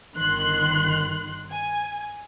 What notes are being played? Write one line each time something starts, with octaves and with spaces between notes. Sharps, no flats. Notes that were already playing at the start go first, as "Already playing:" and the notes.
G1 D#3 C6 F#6
G#5